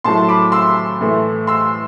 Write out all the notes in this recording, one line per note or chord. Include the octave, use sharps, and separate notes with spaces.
A2 F#3 A3 A5 C6
B5 D6
C6 E6
A2 E3 A3
C6 E6